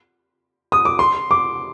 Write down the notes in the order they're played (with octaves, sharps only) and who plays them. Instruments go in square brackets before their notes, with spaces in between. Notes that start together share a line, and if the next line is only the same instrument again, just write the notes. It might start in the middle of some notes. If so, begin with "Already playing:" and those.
[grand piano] D#6
D6
C6
D6